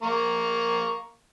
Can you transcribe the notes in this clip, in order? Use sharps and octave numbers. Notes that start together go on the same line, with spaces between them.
A#3 A#5 C#6